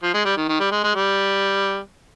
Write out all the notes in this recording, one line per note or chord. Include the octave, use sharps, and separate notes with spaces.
F3
G#3
G3
D#3
D#3
G3
G#3
G#3
G3